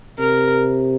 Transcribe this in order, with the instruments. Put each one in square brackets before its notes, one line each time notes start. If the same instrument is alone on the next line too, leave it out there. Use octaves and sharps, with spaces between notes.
[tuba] C3 [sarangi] A#4